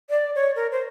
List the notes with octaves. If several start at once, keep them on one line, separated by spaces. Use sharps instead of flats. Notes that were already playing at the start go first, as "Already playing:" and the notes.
D5
C#5
A#4
C5